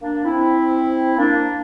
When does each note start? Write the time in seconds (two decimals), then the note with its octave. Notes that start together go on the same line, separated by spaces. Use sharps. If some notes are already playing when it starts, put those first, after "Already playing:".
0.01 A#3 D4
0.25 C4 E4
1.18 A#3 D4